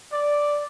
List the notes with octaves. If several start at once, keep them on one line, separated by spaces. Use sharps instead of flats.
D5